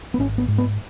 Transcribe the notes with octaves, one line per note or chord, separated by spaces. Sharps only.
B3
G#1 C#4
B3
G#2
B3